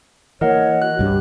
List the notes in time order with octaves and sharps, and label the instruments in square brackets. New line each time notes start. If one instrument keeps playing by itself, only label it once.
[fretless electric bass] E3 A#3 [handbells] A#4 D#5 F#5 [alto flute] C#5
[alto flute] F#4 [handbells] F#6
[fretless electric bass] C2 G2 D4 [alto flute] G4